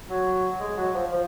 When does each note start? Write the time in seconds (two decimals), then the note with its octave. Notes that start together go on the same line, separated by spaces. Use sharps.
0.10 F#3
0.60 G#3
0.77 F#3
0.94 F3
1.12 F3